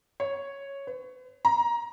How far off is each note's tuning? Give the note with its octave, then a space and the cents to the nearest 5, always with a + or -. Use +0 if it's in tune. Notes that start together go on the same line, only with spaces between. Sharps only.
C#5 -5
B4 +45
A#5 +20